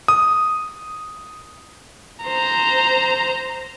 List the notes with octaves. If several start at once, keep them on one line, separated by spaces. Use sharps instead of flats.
D#6
C5 A#5